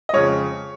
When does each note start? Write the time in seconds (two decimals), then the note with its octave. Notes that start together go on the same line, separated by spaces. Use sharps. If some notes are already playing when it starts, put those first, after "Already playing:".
0.09 D#5
0.13 F2 C#3 G#3 C#5